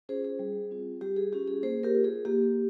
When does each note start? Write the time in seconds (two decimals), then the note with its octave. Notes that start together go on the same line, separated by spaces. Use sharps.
0.09 C#4 F4 G#4 C5
0.24 G#4
0.39 G3
0.71 C4 F4
1.01 G3 G4
1.16 G#4
1.32 C#4 F4 G4
1.48 G#4
1.63 A#3 G#4 C5
1.83 G4 A#4
1.95 F4
2.04 G#4
2.25 A#3 G4